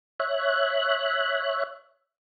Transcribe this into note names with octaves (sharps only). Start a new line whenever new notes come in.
C#5 E5 F#6